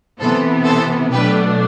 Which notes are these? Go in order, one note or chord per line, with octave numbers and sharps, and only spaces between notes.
C3 E3 B3 A4 C5
A4 C5
B2 F#3 A3 D4 G4 B4